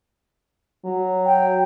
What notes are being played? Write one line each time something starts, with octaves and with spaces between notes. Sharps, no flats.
F#3
G5